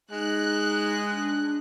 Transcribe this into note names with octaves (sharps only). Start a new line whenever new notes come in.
G#3 D#4 F#6
D4